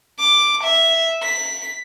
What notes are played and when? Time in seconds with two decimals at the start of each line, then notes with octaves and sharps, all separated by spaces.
0.19 D6
0.63 E5
1.22 B6